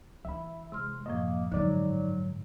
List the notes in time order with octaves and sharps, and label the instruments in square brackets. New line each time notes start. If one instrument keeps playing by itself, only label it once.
[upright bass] E3 E4 [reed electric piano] E5 B5
[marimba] C3 C6 F6 [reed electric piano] G#3
[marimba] F#2 A2 F3 [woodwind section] A#3 [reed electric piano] D#5
[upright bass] G#2 G#3 [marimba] D3 [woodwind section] F#3 [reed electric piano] D#4 D5